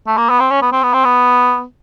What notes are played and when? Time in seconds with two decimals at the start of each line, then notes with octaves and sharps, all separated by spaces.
0.07 A3
0.18 A#3
0.30 B3
0.40 C4
0.51 C#4
0.62 B3
0.72 C4
0.83 B3
0.93 C4
1.05 B3